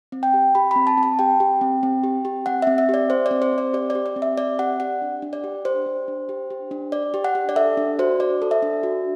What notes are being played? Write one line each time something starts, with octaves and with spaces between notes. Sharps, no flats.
C4
G5
G4
G4 B5
C4 B5
A5
C4
A5
G4 G5
G4
C4
C4
G4
G4
C4 F#5
C4 E5
E5
G4 D5
G4 C5
D5
C4
C5
C4
D5
G4 D5
G4 D5
D5
C4
E5
C4 D5
G4 F#5
G4 F#5
D4
D4
D5
G4
G4 C5
D4
D4
G4
G4
D4
D4 D5
G4
F#5
G4
D5
A4 E5
D4
F#4 C5
D4 D5
A4
E5
D4
F#4